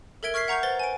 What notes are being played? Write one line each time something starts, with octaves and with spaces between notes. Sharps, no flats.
A4 A#4 E5 G#6 D7 G7
C#6 F6 G#6 B6 C7
F#5 A#5 C#6 G6 F7
B4 C5 A6 G7
G#5 D7